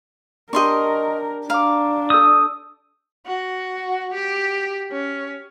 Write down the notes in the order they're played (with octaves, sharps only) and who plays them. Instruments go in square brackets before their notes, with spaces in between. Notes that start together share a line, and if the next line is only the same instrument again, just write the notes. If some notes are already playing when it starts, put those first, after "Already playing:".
[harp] D4 G4 [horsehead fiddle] A#4 [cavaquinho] D#5 C6 C#6
[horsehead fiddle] D4 [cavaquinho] F5 [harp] A#5 D6
[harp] A4 E6 G6 [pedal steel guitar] D#6
[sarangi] F#4
G4
C#4